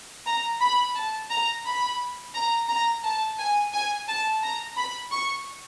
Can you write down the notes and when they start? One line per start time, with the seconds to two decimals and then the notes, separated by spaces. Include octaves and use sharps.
0.26 A#5
0.61 B5
0.95 A5
1.30 A#5
1.65 B5
2.34 A#5
2.69 A#5
3.04 A5
3.39 G#5
3.73 G#5
4.08 A5
4.43 A#5
4.77 B5
5.11 C#6